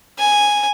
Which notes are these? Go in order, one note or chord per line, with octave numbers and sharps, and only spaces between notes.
G#5